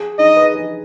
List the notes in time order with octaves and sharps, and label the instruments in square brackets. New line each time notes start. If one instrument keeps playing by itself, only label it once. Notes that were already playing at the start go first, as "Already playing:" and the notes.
Already playing: [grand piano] G#4
[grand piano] D#4 [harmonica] D#5
[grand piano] B4
G#4